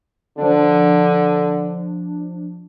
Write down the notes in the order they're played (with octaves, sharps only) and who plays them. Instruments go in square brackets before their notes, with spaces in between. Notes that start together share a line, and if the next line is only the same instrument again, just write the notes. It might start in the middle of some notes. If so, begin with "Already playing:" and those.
[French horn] D3 [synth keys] F3 D4